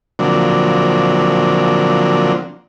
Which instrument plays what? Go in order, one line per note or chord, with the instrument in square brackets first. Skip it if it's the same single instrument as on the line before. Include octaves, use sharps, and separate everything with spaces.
[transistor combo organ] D3 F3 F#3 A#3 C4 D4